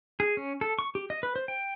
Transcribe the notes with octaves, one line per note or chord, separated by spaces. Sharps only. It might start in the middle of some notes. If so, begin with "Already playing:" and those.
G#4
C#4
A4
C#6
G4
D#5
B4
C5
G5